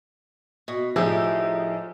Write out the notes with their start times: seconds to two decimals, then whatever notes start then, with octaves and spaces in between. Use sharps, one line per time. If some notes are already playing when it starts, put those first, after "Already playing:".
0.68 B2
0.96 A2 F3 D#4 G4 G#4 E6